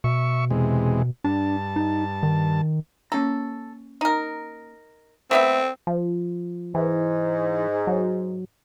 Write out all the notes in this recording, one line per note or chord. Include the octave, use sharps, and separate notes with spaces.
B2 E5 C#6
E2 C3 G#3
G2 D4 A5
D#4
D#3
A#3 C#4 A4 A#5
D#4 A#4
A3 B3 C4 E5
F3
G#2 E3
F#3